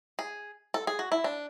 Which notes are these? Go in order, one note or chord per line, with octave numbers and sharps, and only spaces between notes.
G#4
A4
G#4
F#4
E4
D4